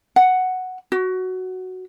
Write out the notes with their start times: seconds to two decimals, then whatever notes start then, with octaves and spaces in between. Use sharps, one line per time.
0.16 F#5
0.92 F#4